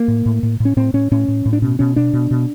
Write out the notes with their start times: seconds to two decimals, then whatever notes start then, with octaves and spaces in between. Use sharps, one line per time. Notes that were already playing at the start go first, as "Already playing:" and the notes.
Already playing: A#3
0.08 A2
0.26 A2
0.43 A2
0.60 A2
0.65 C#4
0.77 A2 C4
0.94 A2 C#4
1.11 A2 C#4
1.28 A2
1.46 A2
1.53 D4
1.62 B2 C#4
1.79 B2 C#4
1.96 B2 D4
2.13 B2
2.31 B2